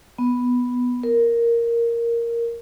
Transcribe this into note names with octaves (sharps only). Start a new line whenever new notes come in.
B3
A#4